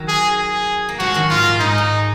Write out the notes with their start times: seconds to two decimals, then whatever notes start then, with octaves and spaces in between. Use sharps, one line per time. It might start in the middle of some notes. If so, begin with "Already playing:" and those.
Already playing: D#3 F#3
0.08 G#4
0.39 G#4
0.89 A#3
0.99 F3 G#3 F#4
1.14 D#3 F#3
1.30 G#2 F4
1.46 A#2
1.60 G#2 D#4
1.78 G#2